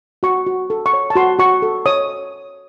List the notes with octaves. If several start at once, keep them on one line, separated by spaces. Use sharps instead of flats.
F#4 C#6
F#4
A4
C#6
C#5
A5
F#4 C6
F#4 C#6
A4
C#5 D#6